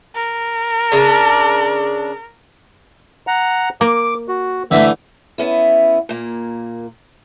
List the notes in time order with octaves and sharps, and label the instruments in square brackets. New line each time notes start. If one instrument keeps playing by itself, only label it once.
[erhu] A#4
[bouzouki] C#3 D4
[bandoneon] F#5 A#5
[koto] A#3 [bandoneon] D6
[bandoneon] F#4
[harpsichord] D3 E3 A3 [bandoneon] E5 E6
[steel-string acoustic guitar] B3 C#4 E4
A#2 A#3